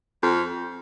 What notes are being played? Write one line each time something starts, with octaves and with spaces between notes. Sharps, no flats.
F2